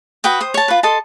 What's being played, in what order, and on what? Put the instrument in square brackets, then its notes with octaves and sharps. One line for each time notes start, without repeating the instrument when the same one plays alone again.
[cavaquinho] F#4 B4 G5 D#6
C5 D#6
C#5 A5
F4 B4
A4 D#5 A5 C6